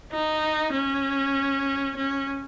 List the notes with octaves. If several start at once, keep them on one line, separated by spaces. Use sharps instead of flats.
D#4
C#4
C#4